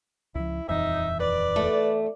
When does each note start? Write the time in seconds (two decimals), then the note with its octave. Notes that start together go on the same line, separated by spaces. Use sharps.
0.35 C#2 F3 E4
0.69 D#1 F2 E3 D#4 E5
1.20 B4 D5
1.56 E2 A3